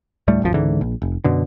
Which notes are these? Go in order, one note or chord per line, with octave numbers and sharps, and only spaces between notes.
D2 A2 G3 A3
D1 G#1 F#2 F3
C#2 G#2 D3 E3
A#1
F1
F#2 B2 D3